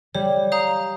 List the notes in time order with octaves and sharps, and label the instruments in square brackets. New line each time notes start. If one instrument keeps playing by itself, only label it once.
[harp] G3 [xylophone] C#5
[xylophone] F5 A#5 D#6 G6